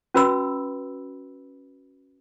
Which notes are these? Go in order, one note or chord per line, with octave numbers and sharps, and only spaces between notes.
C#4 F#4 B4 B5 E6